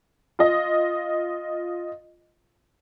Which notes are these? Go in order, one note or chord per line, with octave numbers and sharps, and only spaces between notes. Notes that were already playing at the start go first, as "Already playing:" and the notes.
F4 D#5